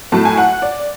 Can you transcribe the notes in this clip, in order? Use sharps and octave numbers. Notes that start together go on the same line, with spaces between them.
A2 F#3 A3 A5
G#5
F#5
D5